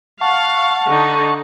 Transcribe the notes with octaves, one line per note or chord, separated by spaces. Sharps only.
F5 F#5 A5 C#6
D3 D#4